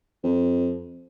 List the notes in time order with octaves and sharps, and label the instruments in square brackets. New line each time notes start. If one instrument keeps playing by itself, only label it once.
[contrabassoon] F2